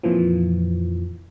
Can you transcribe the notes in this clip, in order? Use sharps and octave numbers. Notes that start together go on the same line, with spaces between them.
F2 A#2 E3 F3